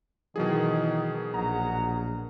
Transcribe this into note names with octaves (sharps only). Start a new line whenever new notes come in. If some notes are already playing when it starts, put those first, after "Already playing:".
B2 D#3 E3 F#3 G#4
A#1 F#5 A#5